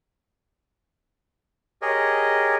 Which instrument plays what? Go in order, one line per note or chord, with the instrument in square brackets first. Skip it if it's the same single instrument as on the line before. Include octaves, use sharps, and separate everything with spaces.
[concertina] G4 G#4 A#4 C#5 D#5